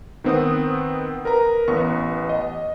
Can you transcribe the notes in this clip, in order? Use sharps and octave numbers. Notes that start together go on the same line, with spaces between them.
D#3 B3 C4 C5 F#5 D#6
A#4 B4 A#5
A1 B3 C#6
D#5